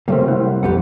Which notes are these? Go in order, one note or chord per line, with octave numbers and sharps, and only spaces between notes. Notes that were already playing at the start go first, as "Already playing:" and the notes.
C3 F#3 G3 A3 A#3 C4
E4 C5 F#5
B1 F2 G4 B4 F#5